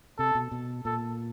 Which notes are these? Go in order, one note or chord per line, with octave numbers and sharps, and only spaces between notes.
C3 A4
B2
B2
A#2 A4